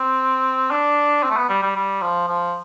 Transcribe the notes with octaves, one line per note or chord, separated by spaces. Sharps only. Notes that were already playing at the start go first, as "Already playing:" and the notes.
Already playing: C4
D4
C4
A3
B3
G3
G3
G3
F3
F3